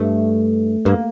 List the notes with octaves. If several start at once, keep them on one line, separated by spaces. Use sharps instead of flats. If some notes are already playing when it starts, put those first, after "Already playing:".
Already playing: G2 A3
G2 A#3